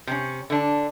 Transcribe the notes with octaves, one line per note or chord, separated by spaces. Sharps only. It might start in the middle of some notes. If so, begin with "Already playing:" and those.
C3 C#4
D3 D4